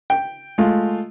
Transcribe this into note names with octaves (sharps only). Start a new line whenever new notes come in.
G5
G#3 A3 F4